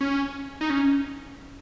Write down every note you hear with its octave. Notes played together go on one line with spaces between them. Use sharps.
C#4
D#4
C#4